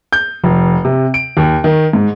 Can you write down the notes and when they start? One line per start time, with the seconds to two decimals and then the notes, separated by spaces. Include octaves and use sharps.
0.13 G6
0.44 F1
0.85 C3
1.14 D7
1.37 D#2
1.64 D#3
1.93 G#2